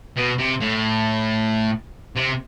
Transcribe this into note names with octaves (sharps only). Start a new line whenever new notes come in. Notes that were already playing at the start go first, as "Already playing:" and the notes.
B2
C3
A2
C3